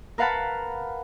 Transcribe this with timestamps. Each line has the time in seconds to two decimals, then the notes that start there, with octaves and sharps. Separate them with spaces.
0.18 A#4 B4 F5 F#5 A5 B5